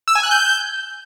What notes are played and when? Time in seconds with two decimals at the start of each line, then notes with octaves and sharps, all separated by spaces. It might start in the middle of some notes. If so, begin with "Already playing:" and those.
0.08 E6
0.15 G#5
0.23 F#6
0.31 G6